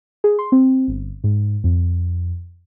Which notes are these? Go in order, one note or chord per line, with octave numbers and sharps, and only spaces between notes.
G#4
C6
C4
G1
G#2
F2